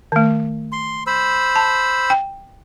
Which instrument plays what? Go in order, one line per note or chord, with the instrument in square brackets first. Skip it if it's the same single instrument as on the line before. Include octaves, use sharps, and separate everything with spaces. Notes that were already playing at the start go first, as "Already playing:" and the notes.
[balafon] D#3 A3
[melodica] C6
C5 B5 E6
[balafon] A5
G5